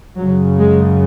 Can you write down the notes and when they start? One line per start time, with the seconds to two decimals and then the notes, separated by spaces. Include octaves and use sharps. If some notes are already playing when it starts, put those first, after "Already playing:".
0.17 F#2 C#3 F#3
0.58 G#3